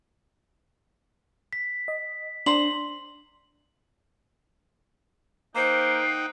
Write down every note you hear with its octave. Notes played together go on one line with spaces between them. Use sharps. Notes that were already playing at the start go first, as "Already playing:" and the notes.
B6
D#5
D4 C5 A#5 D6 F#7
A#3 D#4 C5 F#5 G5 C7